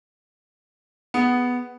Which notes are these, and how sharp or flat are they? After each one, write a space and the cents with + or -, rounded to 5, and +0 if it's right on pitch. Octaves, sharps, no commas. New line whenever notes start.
B3 +0 G#4 +0